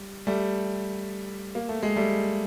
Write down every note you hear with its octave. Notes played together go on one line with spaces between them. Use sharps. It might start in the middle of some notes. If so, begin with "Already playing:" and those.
Already playing: G3
G3 A3
A#3
A3
G#3
G3 A3